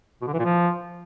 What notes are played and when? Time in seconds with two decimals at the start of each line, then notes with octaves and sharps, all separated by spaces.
0.21 B2
0.27 D3
0.33 E3
0.39 A#2
0.45 F3